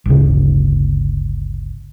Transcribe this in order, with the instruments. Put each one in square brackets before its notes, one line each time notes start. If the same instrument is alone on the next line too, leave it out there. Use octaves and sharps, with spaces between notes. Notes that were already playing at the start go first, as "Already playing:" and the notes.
[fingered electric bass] G1 D2 A2 C#3